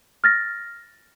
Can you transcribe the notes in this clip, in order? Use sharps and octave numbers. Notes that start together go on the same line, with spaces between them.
F6 A6 A#6